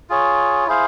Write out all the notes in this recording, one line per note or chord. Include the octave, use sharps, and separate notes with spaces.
F4 G#4 C#5
E4 G#4 C5 F5